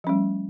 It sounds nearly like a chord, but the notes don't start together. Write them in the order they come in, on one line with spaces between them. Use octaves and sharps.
F3 C#4 G3 A3